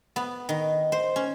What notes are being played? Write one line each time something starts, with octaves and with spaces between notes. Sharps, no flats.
B3
D#3
C5
C#4